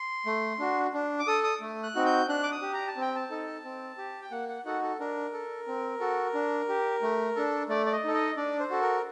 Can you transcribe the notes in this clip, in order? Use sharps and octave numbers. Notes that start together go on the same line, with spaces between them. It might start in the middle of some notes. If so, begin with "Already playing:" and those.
Already playing: C6
A3
D4 F#4
D4
D6
A4 D#6
D#6
A3
F#6
C4 D#4 F#4
G6
D4 F#6
D6
D#6
G4
A#5
A5
C4 G5
A5
D#4 A4
C4
G4
G5
A#3 F#5
F#5
D#4 F#4 A4 F#5
A4
D4 A#4
A4
C4
F#4 A4
D4
G4
A3
D4 A4
A3 D5
D5
D#5
D#4 A4
D#5
D4 D5
C5
F#4 A4
A#4